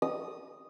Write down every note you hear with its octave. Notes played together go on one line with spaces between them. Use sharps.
D#6